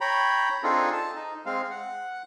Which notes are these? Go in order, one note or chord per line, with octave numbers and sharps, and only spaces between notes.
C#5 G5 A#5 B5
C4 D4 D#4 F4 G#4 A4
A5
D#4
G#3 C4 F5
F#5